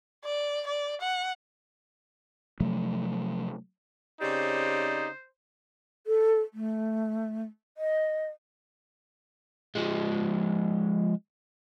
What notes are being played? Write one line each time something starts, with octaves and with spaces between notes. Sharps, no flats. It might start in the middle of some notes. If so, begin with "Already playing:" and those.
D5
D5
F#5
C3 F3 F#3 A3
C#3 C4 D#4 G4 C5 D5
A4
A3
D#5
F3 G#3